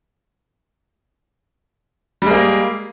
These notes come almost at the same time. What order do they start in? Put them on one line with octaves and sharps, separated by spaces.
G3 G#3 A#3